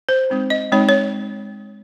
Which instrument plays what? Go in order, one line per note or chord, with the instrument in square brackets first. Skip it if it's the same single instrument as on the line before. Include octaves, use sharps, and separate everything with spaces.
[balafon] C5
G#3 C4 D#4
D#5
G#3 C4 D#4 C#5
C#5